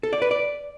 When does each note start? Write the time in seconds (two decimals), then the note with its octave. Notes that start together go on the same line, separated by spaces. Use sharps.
0.03 A4
0.13 D5
0.22 B4
0.31 D5